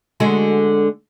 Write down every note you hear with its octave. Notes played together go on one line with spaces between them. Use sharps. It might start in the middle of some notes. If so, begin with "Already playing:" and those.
D3 G#3 F#4